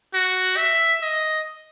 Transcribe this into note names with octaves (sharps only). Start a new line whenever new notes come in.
F#4
E5
D#5